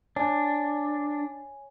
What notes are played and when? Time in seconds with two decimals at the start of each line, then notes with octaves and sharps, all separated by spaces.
0.16 D4 C#5 G#5